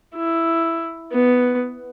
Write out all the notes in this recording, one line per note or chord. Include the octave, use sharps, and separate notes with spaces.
E4
B3